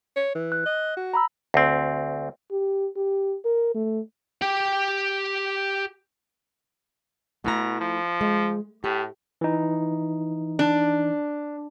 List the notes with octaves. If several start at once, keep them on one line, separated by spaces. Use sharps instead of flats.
C#5
E3
F#6
D#5
F#4
A#5 B5 E6
D2 C4
G4
G4
A#4
A3
G4 G5
B2 A3 E4 A#5
F3
G#3
A2 G4
E3 D#4
D4